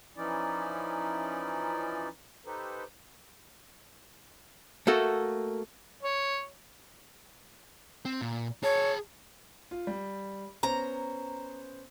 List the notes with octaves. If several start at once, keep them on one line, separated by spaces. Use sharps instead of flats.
E3 F3 C#4 D#4 E4 D5
D#4 G4 A4 B4 C5
A3 A#3 F#4 A4
C#5
C4
A#2
G#4 C#5 A5
F4
G3
B3 C#4 C5 A#5